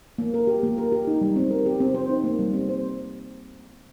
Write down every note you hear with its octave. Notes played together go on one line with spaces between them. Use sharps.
A#3
A#4
G4
A#3
A#4
G4
D#4
G3
C4
A#4
G4
C4
C5
D#4
A#3
G3
C4
C5